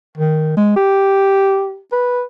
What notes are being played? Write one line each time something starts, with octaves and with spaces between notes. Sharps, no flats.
D#3
G#3
G4
B4